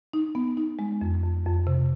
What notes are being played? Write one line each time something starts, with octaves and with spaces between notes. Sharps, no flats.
D#4
B3
D#4
G#3
F2
F2
F2
C3